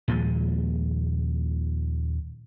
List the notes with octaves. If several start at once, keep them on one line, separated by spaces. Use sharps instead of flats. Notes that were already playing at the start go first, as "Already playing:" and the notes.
D#2 A#2 F3 G#3